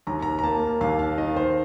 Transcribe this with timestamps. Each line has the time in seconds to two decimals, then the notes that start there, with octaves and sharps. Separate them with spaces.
0.07 D#2 A#5
0.22 A#5
0.39 A#5
0.43 A#3 A5
0.81 D#2 F5
0.99 F5
1.17 D#3 D#5
1.36 C5